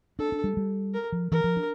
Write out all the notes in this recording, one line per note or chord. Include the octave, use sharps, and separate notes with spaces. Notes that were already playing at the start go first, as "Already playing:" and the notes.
D4 A4
D4
G3
G3
A#4
F3
E3 A#4
F3
D4